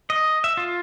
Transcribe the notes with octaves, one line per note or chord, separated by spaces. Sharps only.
D#5
E5
F4